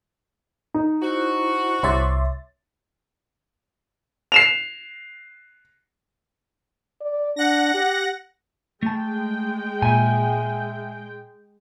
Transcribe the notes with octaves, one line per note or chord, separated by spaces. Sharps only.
D#4
E4 F#4 C5
C2 C#5 E5 C6 D6 A6
C7 E7 F7
D5
D4 F#5 A#6
G4
G#3 A3 G5 A5
A#2 E5 G#5